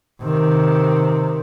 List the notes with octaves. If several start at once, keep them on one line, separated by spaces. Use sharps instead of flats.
C3 D#3